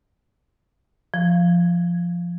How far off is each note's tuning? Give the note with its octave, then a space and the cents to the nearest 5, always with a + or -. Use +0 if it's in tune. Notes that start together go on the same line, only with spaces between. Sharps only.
F3 -10